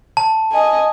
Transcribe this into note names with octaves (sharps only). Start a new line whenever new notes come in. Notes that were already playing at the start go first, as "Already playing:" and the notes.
A5
D#5 G#5